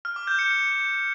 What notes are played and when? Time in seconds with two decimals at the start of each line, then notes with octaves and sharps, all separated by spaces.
0.05 F6
0.16 D6
0.27 G6
0.39 C#7